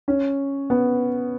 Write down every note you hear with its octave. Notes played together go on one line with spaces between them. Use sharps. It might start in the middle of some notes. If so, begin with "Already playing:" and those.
C#4
B3